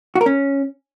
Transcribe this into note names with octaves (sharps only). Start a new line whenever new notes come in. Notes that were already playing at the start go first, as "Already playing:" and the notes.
F#4
A#4
C#4